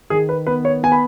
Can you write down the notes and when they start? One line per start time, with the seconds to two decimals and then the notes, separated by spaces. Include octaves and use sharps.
0.10 D#3 G#4
0.29 B4
0.47 B3 B4
0.65 C#5
0.83 B3 G#5
0.92 B5